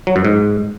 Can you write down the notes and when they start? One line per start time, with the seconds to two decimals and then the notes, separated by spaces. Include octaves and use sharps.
0.07 F#3
0.16 F#2
0.25 G#2